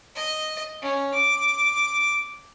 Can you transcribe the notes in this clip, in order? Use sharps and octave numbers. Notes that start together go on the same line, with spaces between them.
D#5
C#4
D6